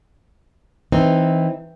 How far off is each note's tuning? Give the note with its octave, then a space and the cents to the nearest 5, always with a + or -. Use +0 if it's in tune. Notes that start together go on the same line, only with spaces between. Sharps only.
E3 -10 C4 +0 D#4 +0